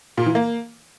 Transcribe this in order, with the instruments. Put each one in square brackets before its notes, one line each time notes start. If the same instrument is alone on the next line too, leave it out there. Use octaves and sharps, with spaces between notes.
[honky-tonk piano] A#2
E3
A#3